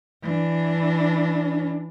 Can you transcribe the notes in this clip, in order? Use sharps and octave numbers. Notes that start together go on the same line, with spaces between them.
E3 D4